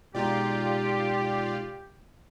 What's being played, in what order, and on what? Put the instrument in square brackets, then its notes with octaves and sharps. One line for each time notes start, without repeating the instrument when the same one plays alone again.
[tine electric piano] B2 G#3 D#4 [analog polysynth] F4 D5 [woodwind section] G4